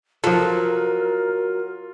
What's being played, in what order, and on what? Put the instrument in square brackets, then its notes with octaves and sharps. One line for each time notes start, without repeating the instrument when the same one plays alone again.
[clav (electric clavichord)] F3 A4 [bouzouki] F#3 [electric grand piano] F4 [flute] A#4